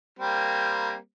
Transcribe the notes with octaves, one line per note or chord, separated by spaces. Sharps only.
G3 A#3 C4